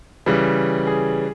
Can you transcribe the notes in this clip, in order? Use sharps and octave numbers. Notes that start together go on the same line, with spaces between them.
C#3 E3 G3
G#4